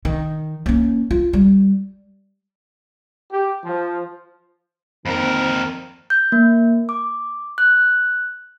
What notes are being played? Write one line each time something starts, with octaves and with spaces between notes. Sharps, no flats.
D#3
A#3 C#4
F4
G3
G4
F3
F2 D#3 A#3 C4 A#4
G6
A#3
D6
F#6